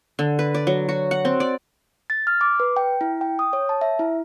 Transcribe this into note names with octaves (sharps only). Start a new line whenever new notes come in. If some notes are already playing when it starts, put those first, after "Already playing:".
D3
B4
D5
F#3
F#4
F#5
C4
D5
A6
F6
D6
B4
G5
E4
G5
D#6
C#5
A5
E5
E4